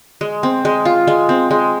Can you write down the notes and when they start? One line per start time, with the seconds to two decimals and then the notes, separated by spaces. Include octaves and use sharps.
0.21 G#3
0.43 C4
0.65 G#3
0.85 F4
1.07 G#3
1.29 C4
1.51 G#3